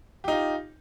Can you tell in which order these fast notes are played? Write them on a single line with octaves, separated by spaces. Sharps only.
G4 D#4 F4